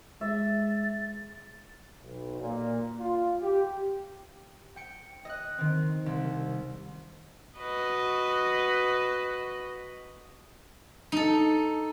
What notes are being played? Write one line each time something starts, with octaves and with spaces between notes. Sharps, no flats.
G#3 E5 A6
B1
A#2
F4
G4
G5 C#7
D#5 F#6
D#3 C4
C2
F#4 B4 D#5
D#4 A4